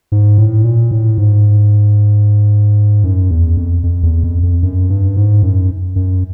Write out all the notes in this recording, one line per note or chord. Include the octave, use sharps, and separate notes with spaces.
G#2
A2
A#2
A2
G#2
F#2
E2
F2
F2
E2
F2
F2
F#2
G2
G#2
F#2
F#2